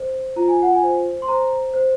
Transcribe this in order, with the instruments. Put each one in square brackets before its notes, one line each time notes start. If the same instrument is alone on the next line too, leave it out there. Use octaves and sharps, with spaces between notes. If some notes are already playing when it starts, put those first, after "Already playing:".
Already playing: [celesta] C5
F4 A#5
G#5
F#5
G#5
C5
C6
C5 A#5
C5